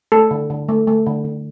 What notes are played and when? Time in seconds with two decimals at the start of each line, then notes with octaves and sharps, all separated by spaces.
0.12 A3 A4
0.31 D3
0.50 D3
0.69 A3
0.87 A3
1.06 D3
1.25 D3